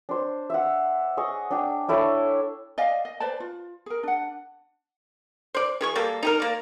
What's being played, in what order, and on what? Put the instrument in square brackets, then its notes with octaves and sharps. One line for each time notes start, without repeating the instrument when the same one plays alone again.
[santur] D4 C5
E5 F#5
G#4 D#5 C#6
D4 G5
D4 E4 A4 C#5
[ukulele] D5 D#5 F5 G#5
D#5
B4 C5 D5 A5
F4
G#4 A#4
D4 F#5
[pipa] C5 D5
E3 G#4 C#6
G3 A#3 A4
D#4 G4 A#4
A#3 D5